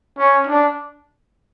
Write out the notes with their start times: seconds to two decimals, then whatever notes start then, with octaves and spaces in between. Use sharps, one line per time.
0.18 C#4
0.47 D4